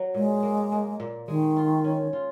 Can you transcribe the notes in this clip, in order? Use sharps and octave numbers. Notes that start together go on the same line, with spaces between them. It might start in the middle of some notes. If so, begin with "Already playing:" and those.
Already playing: F#3
A#2 G#3
A#3
A#3
A#2
D#3 G#3
F4
C#4
F4